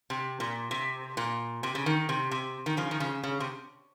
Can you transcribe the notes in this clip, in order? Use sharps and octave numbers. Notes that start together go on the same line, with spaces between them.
C3
A#2
C3
A#2
C3
C#3
D#3
C3
C3
D#3
C#3 F3
D#3
C#3
C#3
C3